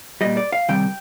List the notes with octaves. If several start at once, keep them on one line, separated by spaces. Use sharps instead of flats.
A#2 G3 D#5
D5
F5
C3 D#3 G3 G5